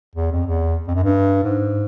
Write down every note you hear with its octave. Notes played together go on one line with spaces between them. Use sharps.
E2
F2
E2
F2
F#2
G2
G#2